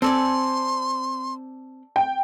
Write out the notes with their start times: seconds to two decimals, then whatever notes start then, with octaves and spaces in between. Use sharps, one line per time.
0.02 C4 A4 D5 G#5 C6
1.96 G5